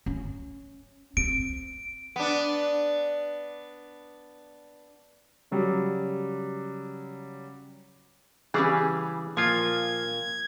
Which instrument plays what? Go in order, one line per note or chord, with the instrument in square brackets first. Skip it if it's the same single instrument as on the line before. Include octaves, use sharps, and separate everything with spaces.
[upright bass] C#4
[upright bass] C4 [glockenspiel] D7
[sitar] B3 D4
[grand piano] C#3 F#3 G3
[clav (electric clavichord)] C#3 E3 G3 [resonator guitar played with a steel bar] C#4 G4 G#4
[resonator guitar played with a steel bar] A#2 A#3 [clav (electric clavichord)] F3 F4 [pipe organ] G#6